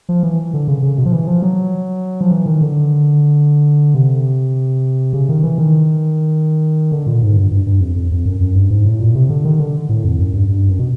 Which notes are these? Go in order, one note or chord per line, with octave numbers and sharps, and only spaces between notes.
F3
E3
D3
C#3
C#3
B2
F3
E3
F3
F#3
F3
E3
D#3
D3
C3
C#3
D#3
E3
D#3
D3
A#2
G#2
G2
G2
G2
F2
F2
F2
F#2
F#2
G2
G#2
A2
A#2
C3
D3
D#3
D3
A2
F2
F#2
G2
G2
F#2
B2